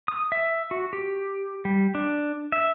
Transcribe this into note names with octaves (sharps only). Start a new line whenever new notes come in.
D#6
E5
F#4
G4
G3
D4
E5